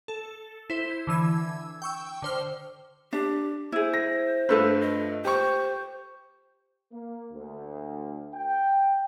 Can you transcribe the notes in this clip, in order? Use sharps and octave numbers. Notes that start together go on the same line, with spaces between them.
A4
E4 C5
D3 E3 E6 G#6
G5 C#6 E6
D3 C5 F6
D4 G4
E4 G#4 C5
A#6
G2 A3 F4 A4 B4
D#5
G4 C5 C#6
A#3
D2
G5